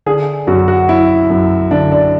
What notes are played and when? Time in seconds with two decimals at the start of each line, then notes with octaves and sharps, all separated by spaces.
0.06 D3 G#4
0.47 F#2 F#4
0.68 F#4
0.89 F#3 E4
1.30 F#2
1.71 D3 D4
1.92 D4